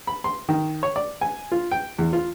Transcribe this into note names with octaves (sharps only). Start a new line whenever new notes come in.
B5
C6
D#3
C#5
D5
G#5
F4
G5
E2
F4